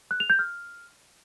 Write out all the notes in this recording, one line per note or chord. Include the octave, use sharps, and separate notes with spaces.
F#6
F7
G6
F6